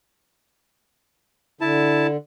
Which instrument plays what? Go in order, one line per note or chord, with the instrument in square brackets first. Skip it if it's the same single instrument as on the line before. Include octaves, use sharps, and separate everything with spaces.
[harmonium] D3 [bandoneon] E4 A5